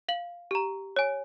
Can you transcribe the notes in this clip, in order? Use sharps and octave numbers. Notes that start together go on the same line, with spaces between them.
F5 F#7
G4 A#5
C#5 G#5